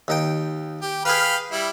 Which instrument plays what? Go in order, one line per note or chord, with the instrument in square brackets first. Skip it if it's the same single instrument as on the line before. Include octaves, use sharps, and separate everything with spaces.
[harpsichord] D#2 D#4 G5
[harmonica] G4
[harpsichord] G#4 B4 [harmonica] F5 G5 B5
[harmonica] G3 E4